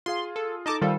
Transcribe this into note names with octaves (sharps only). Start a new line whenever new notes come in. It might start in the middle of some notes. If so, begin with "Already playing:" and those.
F4 G#4 F5 C6
A4
D#4 A4 D#5 A5 D6
D#3 G3 F4 A4 C5 F5